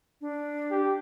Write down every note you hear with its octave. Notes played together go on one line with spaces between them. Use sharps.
D4
G4